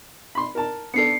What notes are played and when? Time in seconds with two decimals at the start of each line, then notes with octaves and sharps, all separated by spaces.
0.35 B5 C6
0.55 A#4 A5
0.94 B3 D4 A4 C7 C#7